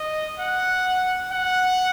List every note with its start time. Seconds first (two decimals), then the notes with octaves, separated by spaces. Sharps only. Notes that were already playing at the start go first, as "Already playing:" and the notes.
Already playing: D#5
0.40 F#5
1.33 F#5